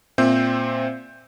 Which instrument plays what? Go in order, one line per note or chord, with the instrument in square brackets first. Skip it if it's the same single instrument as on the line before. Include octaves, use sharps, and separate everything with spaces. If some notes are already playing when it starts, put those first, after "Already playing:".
[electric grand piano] A#2 C4 C5 E5 G6